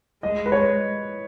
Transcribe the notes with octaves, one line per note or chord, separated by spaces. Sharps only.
G#3 D#5
B4
C#5